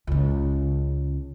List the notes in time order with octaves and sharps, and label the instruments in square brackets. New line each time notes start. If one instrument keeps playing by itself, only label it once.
[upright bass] C#2 C#3